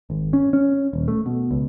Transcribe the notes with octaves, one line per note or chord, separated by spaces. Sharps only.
G#1
C#4
C#4
D#1
A3
B2
C#2